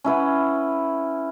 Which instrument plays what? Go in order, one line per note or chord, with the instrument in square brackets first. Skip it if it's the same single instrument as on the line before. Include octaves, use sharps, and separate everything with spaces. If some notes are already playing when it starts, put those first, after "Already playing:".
[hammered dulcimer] C#4 E4 B4 F#5